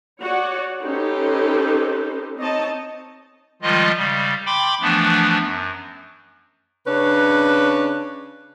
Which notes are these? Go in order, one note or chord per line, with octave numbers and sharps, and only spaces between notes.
F#4 C#5 D5 F#5
C#4 D#4 G4 A4 B4 C5
C4 D#4 C#5 D#5 A5
D#3 F3 G3 G#3 F4 D#5
C#3 G3
G5 B5 C6 D6
E3 F3 A3 B3 D4
F#2
C#3 C#4 D4 B4